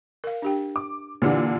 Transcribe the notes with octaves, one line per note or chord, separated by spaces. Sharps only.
A#4 F5
D4 G4 G5
D6
A#2 D3 E3 G4 D5 F#5